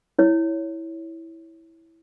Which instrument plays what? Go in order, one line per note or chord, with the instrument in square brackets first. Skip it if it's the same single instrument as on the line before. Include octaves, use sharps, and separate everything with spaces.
[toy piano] E4 C#5